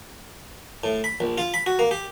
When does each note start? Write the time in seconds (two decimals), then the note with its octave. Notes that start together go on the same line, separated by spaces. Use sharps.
0.84 A2
1.04 B5
1.20 A#1
1.38 F4
1.54 B5
1.66 F#4
1.79 A#3
1.91 G4